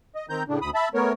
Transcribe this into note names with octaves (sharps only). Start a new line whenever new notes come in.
D#5
D#3 C4 A#5 G6
A2 C#3 D4
D2 B5 D#6
E5 A5 B5
A3 B3 A#4 C#5